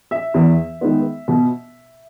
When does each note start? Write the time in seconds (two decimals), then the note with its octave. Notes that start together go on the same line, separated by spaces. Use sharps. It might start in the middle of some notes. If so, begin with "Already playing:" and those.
0.11 E5
0.34 E2
0.81 D#3 G#3 B3
1.28 B2